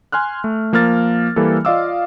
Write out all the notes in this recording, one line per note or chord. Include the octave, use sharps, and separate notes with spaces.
G#5 C6 F6 F#6
A3
F3 A#3 A#4 F6 A6
E3 G3 A#3 A4
F4 D5 D#5 F5 D6 E6